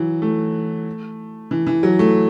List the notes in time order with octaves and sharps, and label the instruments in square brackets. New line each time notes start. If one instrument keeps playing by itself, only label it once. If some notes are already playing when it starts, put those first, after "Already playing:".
Already playing: [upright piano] E3 F#3
A3
E3
E3
F#3
A3